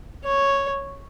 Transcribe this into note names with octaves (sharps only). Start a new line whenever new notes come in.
C#5